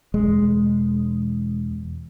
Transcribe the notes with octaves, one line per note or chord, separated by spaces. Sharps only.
E1 G#3